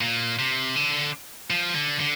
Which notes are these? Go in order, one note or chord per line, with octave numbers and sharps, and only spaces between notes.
A#2
C3
D3
F3
D3
D3